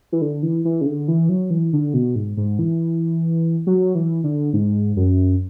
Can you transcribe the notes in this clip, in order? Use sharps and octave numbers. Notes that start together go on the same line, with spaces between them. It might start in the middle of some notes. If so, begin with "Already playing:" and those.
E3
D3
E3
E3
C#3
D3
E3
F#3
E3
D3
B2
G#2
G#2
E3
F#3
E3
D3
G#2
F#2